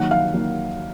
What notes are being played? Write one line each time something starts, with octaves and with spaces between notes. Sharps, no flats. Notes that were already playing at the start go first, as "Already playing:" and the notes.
Already playing: D#3 F#3 A#3 F#5
F5
D#3 F#3 A#3